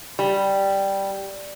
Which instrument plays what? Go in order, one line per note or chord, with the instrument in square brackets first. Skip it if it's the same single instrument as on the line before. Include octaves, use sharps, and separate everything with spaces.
[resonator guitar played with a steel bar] G3